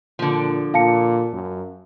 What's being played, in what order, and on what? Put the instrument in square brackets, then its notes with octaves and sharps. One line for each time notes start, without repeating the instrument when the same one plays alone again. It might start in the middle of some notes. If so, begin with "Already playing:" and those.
[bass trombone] A#2 [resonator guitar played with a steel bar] D3 F3
[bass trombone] A#2 [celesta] F5 A5 C#7
[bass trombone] F#2